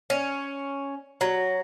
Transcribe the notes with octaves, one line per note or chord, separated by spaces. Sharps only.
C#4
F#3